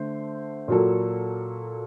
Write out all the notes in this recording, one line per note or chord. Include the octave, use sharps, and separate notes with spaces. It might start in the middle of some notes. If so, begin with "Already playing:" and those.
Already playing: D3 A3 C5
A#2 F#3 A#3 F#4 A4